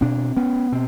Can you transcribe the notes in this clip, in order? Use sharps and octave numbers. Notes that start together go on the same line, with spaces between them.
B2 C4 D4
B3 C#4
B2 C4